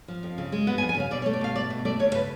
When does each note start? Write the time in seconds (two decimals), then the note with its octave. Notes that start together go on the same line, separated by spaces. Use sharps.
0.08 F3
0.23 F2
0.38 C#3
0.52 G#3
0.67 B3 F#5
0.78 G#5
0.82 F2
0.89 G#5
0.97 C#3 F5
1.11 B2 D5
1.22 C#5
1.26 A3
1.33 D5
1.41 B2 F5
1.55 A3 D5
1.70 B2
1.85 A3 D5
1.99 D2 C#5
2.14 C#3 B4